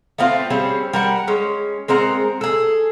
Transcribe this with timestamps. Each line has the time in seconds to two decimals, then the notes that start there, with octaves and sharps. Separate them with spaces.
0.18 A3 B3 C4 F4
0.50 G3 C4 C#4 G#4
0.93 G3 A#4 F#5
1.28 G#3 C#4
1.88 G#3 C4 A#4 F#5
2.41 G#4 A4